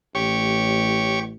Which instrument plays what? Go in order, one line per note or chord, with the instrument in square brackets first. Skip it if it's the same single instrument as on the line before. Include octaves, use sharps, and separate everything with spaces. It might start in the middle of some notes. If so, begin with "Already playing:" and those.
[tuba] A1 [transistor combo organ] G4 C#5 C#6